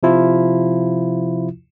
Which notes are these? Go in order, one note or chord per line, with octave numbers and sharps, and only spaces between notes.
C3 F3 E4 F4